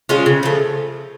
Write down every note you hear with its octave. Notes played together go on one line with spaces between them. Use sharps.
G#3 C#4 F4
C#3
F3 A3